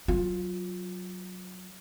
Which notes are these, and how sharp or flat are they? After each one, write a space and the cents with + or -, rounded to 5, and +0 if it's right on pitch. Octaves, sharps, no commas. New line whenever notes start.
F#3 +0 F4 +15